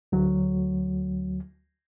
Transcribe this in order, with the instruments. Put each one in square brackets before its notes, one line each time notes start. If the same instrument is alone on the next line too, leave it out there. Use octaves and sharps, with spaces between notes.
[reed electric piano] D2 F#3